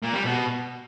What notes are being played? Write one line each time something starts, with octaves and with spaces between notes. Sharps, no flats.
A#2
G3
B2